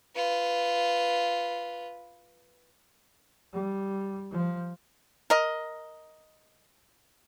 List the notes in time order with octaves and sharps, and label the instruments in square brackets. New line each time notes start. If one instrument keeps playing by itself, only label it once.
[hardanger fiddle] F4 B4
[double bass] G3
F3
[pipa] A#4 D#5